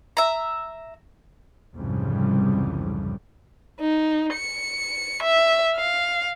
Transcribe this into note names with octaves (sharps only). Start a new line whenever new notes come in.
E5 A#5
C2 F2 G#2 C#3 E3 G3
D#4
C#7
E5
F5